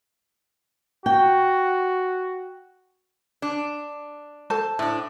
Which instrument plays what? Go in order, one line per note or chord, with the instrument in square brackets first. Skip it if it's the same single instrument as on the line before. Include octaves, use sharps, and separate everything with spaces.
[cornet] F#4 [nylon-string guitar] G5
[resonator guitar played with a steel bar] D4
[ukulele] A4 C5 A5
[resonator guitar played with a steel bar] A2 D4